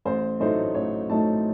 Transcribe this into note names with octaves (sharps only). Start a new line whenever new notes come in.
A1 C5
A2 F#3 A3 D#4 C5
A1 C#5
A2 F#3 A3 D#4 A5